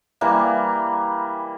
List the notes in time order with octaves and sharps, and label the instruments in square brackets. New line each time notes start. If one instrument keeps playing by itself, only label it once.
[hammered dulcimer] E3 G3 A#3